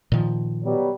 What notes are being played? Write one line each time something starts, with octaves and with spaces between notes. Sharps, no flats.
A#2 D#3 F3
B2 F#3 G3